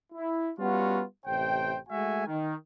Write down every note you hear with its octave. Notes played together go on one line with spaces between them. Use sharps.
E4
G3 B3 C#4 F4 F#4
A1 C3 C5 G5
G#3 A3 F#4 E5 G#5
D#3